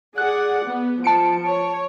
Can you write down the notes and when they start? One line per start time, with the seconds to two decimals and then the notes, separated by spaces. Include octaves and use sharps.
0.18 G#4 D5 F#5 F#6
0.69 B3
1.04 F3 A5 C#7 D7
1.45 C#5